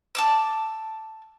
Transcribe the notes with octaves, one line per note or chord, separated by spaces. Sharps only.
A5 D6 E6